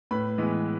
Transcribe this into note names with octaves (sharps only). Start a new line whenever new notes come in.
A2 B4 B5
E3 G#3 B3